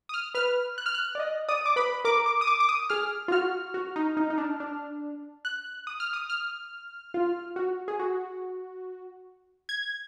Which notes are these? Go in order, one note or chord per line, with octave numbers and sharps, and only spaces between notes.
D#6
F6
B4 F6
F#6
F6
F#6
D5
D#5
D5 D#6
D6
B4 B5
A#4 D6
D6
D#6
D6
D6
D#6
G#4 F6
F4
F#4 F6
F#4
D#4
D#4
D#4
D4
D4
F#6
D#6
F6
D#6
F6
F4
F#4
G#4
F#4
G#6